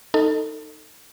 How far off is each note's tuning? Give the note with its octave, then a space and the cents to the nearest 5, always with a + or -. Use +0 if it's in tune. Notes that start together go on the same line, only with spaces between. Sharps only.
D#4 +0 A4 +25